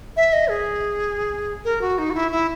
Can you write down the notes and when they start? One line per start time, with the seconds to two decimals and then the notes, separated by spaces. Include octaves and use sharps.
0.17 E5
0.33 D#5
0.50 G#4
1.65 A#4
1.81 F#4
1.98 D#4
2.10 F#4
2.14 E4
2.32 E4